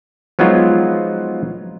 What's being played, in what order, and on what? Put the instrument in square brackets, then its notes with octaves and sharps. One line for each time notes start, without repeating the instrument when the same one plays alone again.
[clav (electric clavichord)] F3 F#3 G#3 B3 D#4 F4